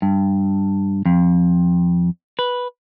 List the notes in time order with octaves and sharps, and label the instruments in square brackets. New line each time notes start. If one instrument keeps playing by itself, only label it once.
[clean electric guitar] G2
F2
B4